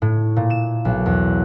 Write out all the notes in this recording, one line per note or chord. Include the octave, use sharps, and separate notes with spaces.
A2
A#2
E7
B1
E2